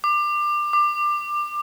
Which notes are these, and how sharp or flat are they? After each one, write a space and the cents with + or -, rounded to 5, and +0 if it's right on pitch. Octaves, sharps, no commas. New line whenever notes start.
D6 +25
D6 +20